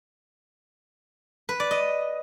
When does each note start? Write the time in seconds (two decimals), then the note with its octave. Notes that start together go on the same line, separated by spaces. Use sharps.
1.49 B4
1.60 D5
1.71 D#5